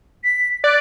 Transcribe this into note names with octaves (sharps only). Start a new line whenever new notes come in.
B6
D5 F#6